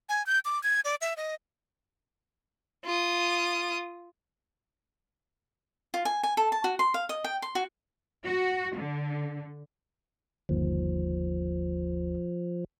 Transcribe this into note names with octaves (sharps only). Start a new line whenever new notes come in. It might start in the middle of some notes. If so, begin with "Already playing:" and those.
G#5
G6
D6
G#6
D5
E5
D#5
F4 D#6
F4
G#5
G#5
A4
A5
F#4
C6
F5
D#5
G5
C6
F#4
F#4
D3
G1 D#2 F3